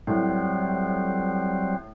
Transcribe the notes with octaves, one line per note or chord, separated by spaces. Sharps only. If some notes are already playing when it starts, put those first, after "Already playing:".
A2 F#3 G3 C4